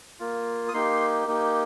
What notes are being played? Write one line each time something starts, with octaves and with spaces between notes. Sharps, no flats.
A#3 F4
D#6
A#3 D#4 G4 C6
A#3 D#4 G4